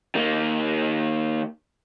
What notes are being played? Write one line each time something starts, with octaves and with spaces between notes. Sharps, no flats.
D#3 A#3